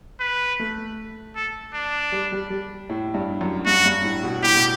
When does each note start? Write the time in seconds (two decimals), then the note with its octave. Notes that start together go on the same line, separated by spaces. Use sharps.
0.20 B4
0.60 A3
1.36 A4
1.74 D4
2.12 G3
2.32 G3
2.50 G3
2.90 A2
3.14 G2
3.41 F#2
3.66 G2 F#4
3.85 G2
4.04 A2
4.23 B2
4.43 A2 G4
4.55 B2